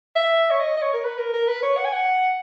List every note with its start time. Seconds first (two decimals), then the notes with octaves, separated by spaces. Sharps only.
0.16 E5
0.51 C#5
0.60 D#5
0.77 D#5
0.82 C#5
0.93 A#4
1.04 B4
1.18 A#4
1.33 A#4
1.48 B4
1.63 C#5
1.77 F#5
1.85 G#5
1.93 F#5